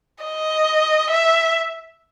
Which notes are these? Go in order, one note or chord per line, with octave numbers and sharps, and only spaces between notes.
D#5
E5